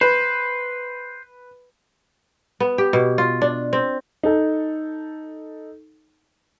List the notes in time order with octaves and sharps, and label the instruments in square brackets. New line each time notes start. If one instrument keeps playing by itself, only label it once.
[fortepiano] B4 [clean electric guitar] C5
[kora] B3
G4
B2
F4
D4
C4
[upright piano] D#4 A4